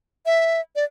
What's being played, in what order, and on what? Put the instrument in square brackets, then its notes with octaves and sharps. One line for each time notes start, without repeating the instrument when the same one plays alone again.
[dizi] E5
D5